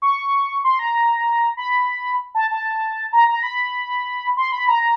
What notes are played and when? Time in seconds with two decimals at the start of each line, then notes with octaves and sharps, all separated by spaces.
0.02 C#6
0.64 C6
0.79 A#5
1.57 B5
2.35 A5
2.51 A5
3.13 A#5
3.28 A#5
3.43 B5
4.37 C6
4.52 B5
4.68 A#5